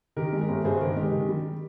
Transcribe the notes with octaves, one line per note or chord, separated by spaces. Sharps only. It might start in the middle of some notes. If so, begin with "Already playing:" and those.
D#3 G4 A#4
G#3
G4 A#4
G1
G2 G#4 C5
D#3 G4 A#4
G#3 G4
D#3
G3